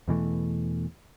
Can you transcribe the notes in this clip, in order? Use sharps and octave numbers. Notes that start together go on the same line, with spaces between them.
E2 B2 E3 A3